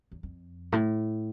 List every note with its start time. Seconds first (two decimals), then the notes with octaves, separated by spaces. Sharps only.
0.11 E2
0.23 F2
0.72 A2